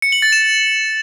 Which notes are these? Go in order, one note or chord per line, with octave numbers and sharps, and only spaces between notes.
C#7
F#7
A6
E7